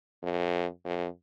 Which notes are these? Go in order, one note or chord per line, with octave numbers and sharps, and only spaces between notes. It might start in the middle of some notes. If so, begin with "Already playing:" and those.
F2
F2